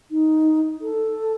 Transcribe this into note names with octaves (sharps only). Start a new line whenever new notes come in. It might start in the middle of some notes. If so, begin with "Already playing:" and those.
D#4
A4